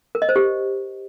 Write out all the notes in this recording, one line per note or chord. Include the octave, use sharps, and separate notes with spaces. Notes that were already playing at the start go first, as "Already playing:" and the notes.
A#4
D#5
C5
G4